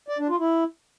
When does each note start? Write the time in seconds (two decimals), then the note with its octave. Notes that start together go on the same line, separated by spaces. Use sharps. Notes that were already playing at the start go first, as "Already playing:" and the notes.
0.08 D5
0.19 D4
0.29 F4
0.39 E4